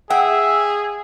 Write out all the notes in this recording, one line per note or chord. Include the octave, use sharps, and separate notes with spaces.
G#4 E5 F#5 G5